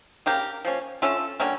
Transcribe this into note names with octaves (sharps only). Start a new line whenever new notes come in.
C#3 G3 A#3 G4 A#4
F3 A#3 C#4
D3 A3 C#4 F4 A4
D3 G3 A#3 C#4